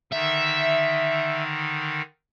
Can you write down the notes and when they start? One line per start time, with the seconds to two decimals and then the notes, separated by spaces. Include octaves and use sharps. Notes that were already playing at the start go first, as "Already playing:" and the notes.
0.12 D3 D#3 D#4 E5